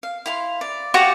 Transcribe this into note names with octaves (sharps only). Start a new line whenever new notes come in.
F5
E4 F5 C6
D5
F#4 G4 D5 F5